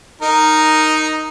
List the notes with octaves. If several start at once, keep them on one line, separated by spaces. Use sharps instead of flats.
D#4 A#4